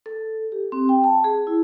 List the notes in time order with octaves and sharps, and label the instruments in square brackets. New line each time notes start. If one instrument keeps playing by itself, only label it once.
[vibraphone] A4
G4
C4
G5
A5
G#4
E4